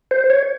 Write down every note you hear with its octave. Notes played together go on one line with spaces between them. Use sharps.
C5
C#5